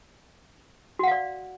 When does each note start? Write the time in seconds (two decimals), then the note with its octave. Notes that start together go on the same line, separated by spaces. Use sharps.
0.99 F#4
1.03 F#5
1.07 F5
1.12 D5